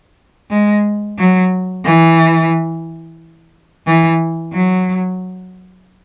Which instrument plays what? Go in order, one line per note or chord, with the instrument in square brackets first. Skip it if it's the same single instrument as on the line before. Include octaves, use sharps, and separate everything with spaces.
[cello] G#3
F#3
E3
E3
F#3